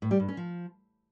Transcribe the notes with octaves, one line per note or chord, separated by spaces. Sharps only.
A2
G3
G2
C#4
F3